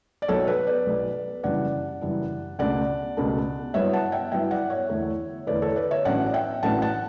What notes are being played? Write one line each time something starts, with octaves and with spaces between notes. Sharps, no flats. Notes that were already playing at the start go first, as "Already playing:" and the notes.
D5
B1 B2 F#3 A4 C#5
B4
B4 D5
B1 B2 F#3
F#1 F#2 E3 G3 D4 D5 F#5
F#1 F#2 E3 G3 D4
C#2 B2 A3 D4 D5 F#5
C#2 B2 A3 D4
G2 F#3 B3 E4 C#5 E5
F#5 A5
E5 G5
G2 F#3 B3 E4 E5 G5
D5 F#5
C#5 E5
E2 D3 A3 E4
E2 D3 A3 E4 B4 D5
A4 C#5
B4 D5
C#5 E5
A1 A2 F#3 B3 D4 D5 F#5
E5 G5
A1 A2 F#3 B3 D4 F#5 A5
F#5 A5